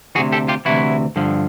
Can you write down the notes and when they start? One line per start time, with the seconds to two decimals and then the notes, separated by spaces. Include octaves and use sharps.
0.15 D2 C3 E3 F#4 G#4
0.32 G4 A4
0.48 F4 G4
0.65 D2 C3 E3 E4 F#4
1.16 G2 D3 F3